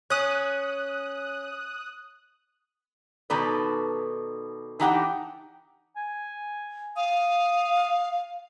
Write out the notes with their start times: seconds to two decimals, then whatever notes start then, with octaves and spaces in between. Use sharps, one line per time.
0.10 C#4 D#6 F#6
3.30 B2 D#3 D#4 A4 B4 D5
4.80 E3 D4 D#4 G4 F#5 G5
5.96 G#5
6.96 F5 D#6